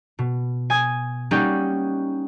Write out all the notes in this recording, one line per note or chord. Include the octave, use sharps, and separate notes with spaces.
B2
G#5 D#6 G#6
G3 A#3 C#4 D#4 F#5 G5